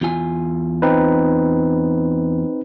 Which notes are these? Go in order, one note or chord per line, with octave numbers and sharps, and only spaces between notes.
E2 F4 G#5
C4 D#4 B4